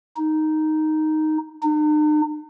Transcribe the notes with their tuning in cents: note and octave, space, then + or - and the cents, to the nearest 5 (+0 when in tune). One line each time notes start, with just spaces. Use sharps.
D#4 +0
D#4 -45